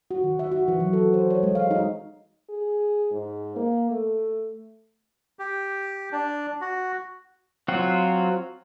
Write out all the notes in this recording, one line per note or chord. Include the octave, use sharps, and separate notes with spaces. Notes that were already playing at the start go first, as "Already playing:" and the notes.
F#4
D#3
E5
F#4
E3
F#3
A4
C5
C#5
G#3
F5
D#4
G#4
G#2
A#3
A3
G4
D4
F#4
F#3 C4 F4 F#4